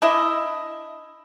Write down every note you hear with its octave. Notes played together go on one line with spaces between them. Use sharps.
D4 E4 D#5 E5